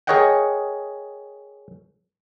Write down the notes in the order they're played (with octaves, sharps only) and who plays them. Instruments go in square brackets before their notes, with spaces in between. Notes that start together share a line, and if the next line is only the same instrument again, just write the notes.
[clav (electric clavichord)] G#4 A#4 C#5 D#5 F#5 G5